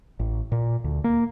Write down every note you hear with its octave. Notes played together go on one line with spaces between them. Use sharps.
A1
A#2
D2
A#3